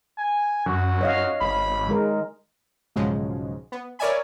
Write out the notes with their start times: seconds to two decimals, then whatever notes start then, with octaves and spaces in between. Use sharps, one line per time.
0.18 G#5
0.66 F#2 F#4
1.01 C#5 D#5 F5
1.41 G#1 B5
1.87 D#3 G#3 A#4
2.96 B1 G#2 C#3 F3 F#3 G#3
3.72 B3
3.99 A#4 C#5 D5 E5 G#5 B5